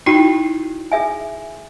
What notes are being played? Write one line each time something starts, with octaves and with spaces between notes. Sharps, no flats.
D#4 E4 F#4 G5 C#6
G#4 E5 G#5